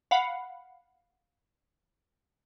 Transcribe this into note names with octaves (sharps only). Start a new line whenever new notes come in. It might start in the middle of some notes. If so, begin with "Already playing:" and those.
F5 F#5 B5